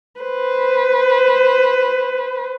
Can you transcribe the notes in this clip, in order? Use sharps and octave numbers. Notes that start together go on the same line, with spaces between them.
B4 C5